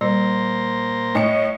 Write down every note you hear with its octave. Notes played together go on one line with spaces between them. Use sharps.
A#2 G3 C5 A#5
A2 D#5 C#7